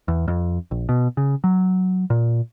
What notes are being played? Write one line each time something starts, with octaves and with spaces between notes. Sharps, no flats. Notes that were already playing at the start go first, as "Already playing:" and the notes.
E2
F2
A#1
B2
C#3
F#3
A#2